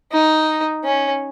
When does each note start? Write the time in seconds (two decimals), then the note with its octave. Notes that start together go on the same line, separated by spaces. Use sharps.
0.12 D#4
0.84 C#4